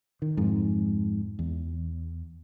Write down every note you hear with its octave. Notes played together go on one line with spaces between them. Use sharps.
D#3
F2 G#2
E2